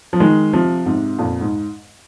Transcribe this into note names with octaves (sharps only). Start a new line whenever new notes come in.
F3
D#3 G#3
C3 F3
G#2 C3
F2 A#2
G#2